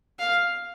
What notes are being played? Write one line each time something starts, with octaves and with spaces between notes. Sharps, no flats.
F5